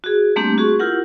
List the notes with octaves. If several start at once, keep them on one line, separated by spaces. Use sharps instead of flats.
F#4 G#4
G3 A3 A#3 C4 D4 G4
F#4 G#4 C#6
E4 F4 G4 A#4 F#5